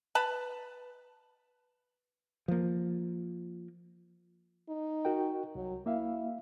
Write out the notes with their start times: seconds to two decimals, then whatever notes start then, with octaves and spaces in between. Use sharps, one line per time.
0.15 B4 A5 B5
2.48 F3 A#3
4.69 D#4
5.05 F#4 A#4 G5
5.55 C2 F#3
5.86 A#3 E4 E5 F5